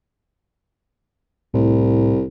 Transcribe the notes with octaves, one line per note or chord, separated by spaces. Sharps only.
C2 A2